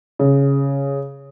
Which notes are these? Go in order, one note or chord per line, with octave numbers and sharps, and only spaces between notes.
C#3